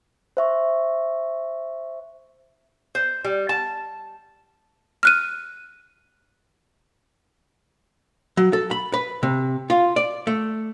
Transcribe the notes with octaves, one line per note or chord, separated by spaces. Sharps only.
C5 E5 C#6
C5
G3
A5
F6 F#6 D#7
F#3
A4
B5
B4
C3
F4
D5
A3